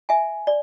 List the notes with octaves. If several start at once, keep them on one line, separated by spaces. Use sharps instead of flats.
E5 G#5
D5